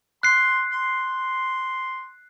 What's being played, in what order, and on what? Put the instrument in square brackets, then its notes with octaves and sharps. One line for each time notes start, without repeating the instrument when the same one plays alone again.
[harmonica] C6 [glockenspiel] F#6 C7
[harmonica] C6